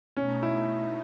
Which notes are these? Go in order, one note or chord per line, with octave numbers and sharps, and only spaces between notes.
B2 A3 C#4 D#4
E4